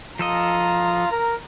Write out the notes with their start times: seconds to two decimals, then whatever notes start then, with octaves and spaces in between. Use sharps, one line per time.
0.19 F3 F4 A4 D#5 A#5
1.11 A#4